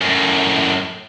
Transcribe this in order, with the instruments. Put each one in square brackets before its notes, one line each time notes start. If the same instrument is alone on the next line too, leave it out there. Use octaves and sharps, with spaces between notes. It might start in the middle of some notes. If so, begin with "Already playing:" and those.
[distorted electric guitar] F#2 A2